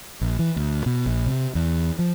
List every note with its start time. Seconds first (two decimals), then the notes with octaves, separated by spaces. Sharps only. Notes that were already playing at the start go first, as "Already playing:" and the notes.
0.21 A#1
0.39 E3
0.56 D2
0.86 B2
1.06 A#1
1.27 C3
1.55 E2
1.99 F3